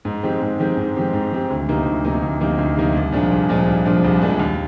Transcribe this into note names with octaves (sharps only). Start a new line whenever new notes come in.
G#2
D#3 G#3 C4 G4
G#2
D#3 G#3 C4 G4
G#2
D#3 G#3 C4 G4
G#2
D#3 G#3 C4 G4
D2
C3 D#3 A#3 D#4
D2
C3 D#3 A#3 D#4
D2
C3 D#3 A#3 D#4
D2
C3 D#3 A#3 D#4
C2
A#2 F3 G#3 D4
C2
A#2 F3 G#3 D4
C2
A#2 F3 G#3 D4
C2
A#2 F3 G#3 D4
D#2